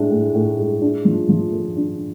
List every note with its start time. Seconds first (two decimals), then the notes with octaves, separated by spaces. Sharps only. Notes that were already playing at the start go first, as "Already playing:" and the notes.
Already playing: A2 G#3 D4
0.11 A2
0.35 A2
0.58 G#3
0.82 D4
1.05 F3
1.29 F3
1.52 A3
1.77 D4